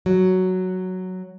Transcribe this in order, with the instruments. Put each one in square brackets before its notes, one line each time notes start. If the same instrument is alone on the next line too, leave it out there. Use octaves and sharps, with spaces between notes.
[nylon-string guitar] F#3